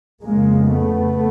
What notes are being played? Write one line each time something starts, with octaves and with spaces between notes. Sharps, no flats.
F2 C#3 G#3 A#3
A3 B3